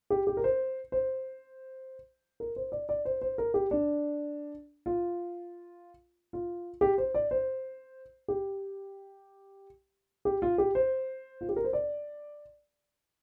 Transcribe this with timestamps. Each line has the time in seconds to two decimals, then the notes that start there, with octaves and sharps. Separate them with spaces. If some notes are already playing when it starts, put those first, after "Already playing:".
0.10 G4
0.27 G4
0.37 A#4
0.44 C5
0.92 C5
2.40 A#4
2.56 C5
2.72 D5
2.89 D5
3.05 C5
3.22 C5
3.38 A#4
3.54 G4
3.71 D4
4.86 F4
6.33 F4
6.81 G4
6.98 C5
7.14 D5
7.31 C5
8.28 G4
10.25 G4
10.42 F4
10.58 G4
10.75 C5
11.41 F4
11.49 G4
11.56 A#4
11.64 C5
11.73 D5